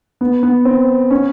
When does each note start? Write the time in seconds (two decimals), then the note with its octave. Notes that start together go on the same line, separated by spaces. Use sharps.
0.21 B3
0.43 B3
0.65 C4
1.11 C#4